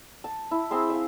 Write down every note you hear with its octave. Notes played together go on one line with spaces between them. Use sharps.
A5
E4
C4 G#4 E5 C6
E5 F5